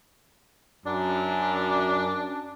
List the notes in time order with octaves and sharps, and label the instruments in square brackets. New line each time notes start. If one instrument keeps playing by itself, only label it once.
[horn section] F#2 [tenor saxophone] D4